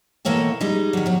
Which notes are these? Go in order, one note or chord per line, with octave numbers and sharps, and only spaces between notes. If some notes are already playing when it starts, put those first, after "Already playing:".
B2 E3 A#3 A4 C#5 G5
G3 G#3 D#4
D#3 F#3
B2 F#3